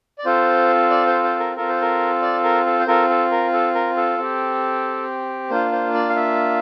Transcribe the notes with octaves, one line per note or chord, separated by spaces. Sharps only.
D5
C4 F4 A4 C5
D5
C5
C5
A#4
C4 F4 A4 A#4
C5
A#4
D5
A#4
A4
C5
C4 F4 A4 A#4
A4
A#4
A4
A#4
A4
C4 G4
A#3 D4 F4 C5
C5
D5
F5
E5